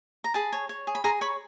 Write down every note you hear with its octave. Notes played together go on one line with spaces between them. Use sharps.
A#5
G#4 A5 B5
C#5
C#5
G#4
B5
G#4 A#5 C6
C#5 B5 C#6